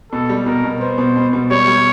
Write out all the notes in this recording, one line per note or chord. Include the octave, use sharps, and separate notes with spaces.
B2 A4
G3
B2 A#4
B2
B3 C5
B2
B2
B2
G3 C#5
G3